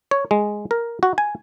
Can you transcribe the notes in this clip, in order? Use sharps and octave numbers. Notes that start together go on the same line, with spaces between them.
C#5
G#3
A#4
F#4
G#5